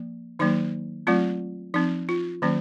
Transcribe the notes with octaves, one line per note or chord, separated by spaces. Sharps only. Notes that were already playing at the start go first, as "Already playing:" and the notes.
Already playing: F3 A#3
D#3 F#3 A#3 D#4
F#3 A3 C4 F4
F3 C4 D#4
F4
D#3 F#3 A#3 C#4